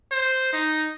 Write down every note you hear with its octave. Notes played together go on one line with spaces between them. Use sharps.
C5
D#4